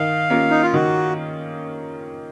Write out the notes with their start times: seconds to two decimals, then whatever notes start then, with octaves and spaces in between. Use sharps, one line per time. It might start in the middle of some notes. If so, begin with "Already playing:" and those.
Already playing: D#3 F5
0.30 A#3 C#4 F4
0.50 D#4
0.62 F4
0.74 D#3 F#4